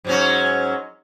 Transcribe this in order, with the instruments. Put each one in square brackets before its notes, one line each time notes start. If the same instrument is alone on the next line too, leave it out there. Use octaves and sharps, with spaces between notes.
[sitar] G#2 F#3 C#4